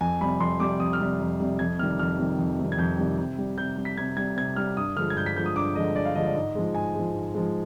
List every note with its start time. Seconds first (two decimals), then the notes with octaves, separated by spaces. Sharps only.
0.01 F2 G#5
0.21 C3 G3 B5
0.40 F2 C6
0.60 C3 G3 D6
0.80 F2 D#6
0.93 F6
1.00 C3 G3
1.20 F2
1.40 C3 G3
1.59 F2 G#6
1.79 C3 D#3 G3 F6
1.99 F2 F6
2.18 C3 D#3 G3
2.39 F2
2.59 C3 D#3 G3
2.72 G#6
2.78 F2 G6
2.98 C3 D#3 G3
3.18 C3
3.38 G3
3.58 C3 G6
3.78 G3
3.85 B6
3.98 C3 G#6
4.17 G3 G#6
4.37 C3 G#6
4.56 G3 F6
4.77 G2 D#6
4.96 D3 F3 G#3 F6
5.10 G#6
5.16 G2 G6
5.26 B6
5.36 D3 F3 G#3 G6
5.46 D#6
5.56 G2 D6
5.75 D3 F3 G#3 D#5
5.95 G2 D5
6.05 F5
6.15 D3 F3 G#3 D#5
6.26 D5
6.36 G#2 D#5
6.55 F3 G#3
6.75 G#2 G#5
6.95 F3 G#3
7.14 G#2
7.34 F3 G#3